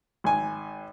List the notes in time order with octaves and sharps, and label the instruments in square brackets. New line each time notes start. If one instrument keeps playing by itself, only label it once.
[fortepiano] G#1 G#5